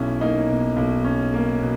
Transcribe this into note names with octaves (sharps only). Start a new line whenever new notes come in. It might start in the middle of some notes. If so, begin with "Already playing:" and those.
Already playing: B1 B2 C#4 E4
A#3 D#4
B2
B1
C#4
A#3
B2